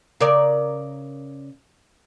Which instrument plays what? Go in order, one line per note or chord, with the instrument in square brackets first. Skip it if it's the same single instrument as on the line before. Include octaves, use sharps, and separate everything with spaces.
[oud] C#3 A#4 D5